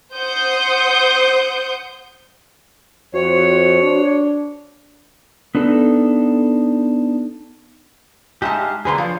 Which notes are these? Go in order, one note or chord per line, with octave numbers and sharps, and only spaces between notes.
C5 F#5 D#6 G6
F2 F#4 C5 C#5
D4
B3 D4 D#4 A4
G#3 D#4 G4 E5 F5 A5
D3 F#3 A#3 G#4 B4 C6
F3 C#5 F5